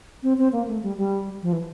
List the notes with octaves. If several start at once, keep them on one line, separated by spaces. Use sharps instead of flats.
C4
C4
A#3
A3
G3
G3
F3
E3